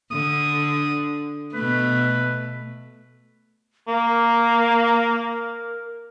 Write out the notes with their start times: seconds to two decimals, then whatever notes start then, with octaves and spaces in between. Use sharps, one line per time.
0.11 D3 D#6
1.54 B2 A3 B4
3.88 A#3 A#4